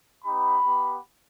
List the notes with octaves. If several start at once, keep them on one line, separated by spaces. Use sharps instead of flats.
B3 D#4 G4 B5
B3 G4